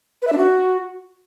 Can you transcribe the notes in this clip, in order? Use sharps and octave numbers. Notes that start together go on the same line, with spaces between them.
B4
E5
D4
F#4